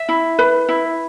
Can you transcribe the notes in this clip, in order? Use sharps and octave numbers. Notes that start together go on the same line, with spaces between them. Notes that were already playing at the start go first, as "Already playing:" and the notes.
Already playing: E5
E4
B4
E4